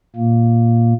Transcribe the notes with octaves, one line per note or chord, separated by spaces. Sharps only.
A#2 A#3